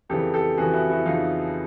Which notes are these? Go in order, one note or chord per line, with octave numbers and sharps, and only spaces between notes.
F2 C#3 E3 G4 A4
G4 A4
F2 C#3 E3 F#4 G#4
E4 F#4
E4 F#4
F2 C#3 E3 D#4 F4